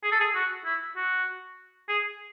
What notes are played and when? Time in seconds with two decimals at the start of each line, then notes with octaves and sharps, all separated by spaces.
0.03 G#4
0.12 A4
0.20 G#4
0.35 F#4
0.65 E4
0.96 F#4
1.89 G#4